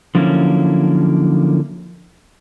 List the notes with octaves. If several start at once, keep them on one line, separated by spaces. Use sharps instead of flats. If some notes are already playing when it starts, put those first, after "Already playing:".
D3 F3 F#3 A#3 C#4 E4